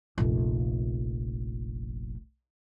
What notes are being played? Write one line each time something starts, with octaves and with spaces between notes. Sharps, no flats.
F1 A#1